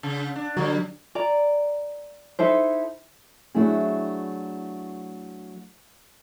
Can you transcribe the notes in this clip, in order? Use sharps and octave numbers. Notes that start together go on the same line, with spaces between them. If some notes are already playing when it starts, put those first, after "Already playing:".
C#3
D4
D3 F#3 G3
D5 A#5
D#4 E4 A4 C5
F#3 A3 D4 E4 G#4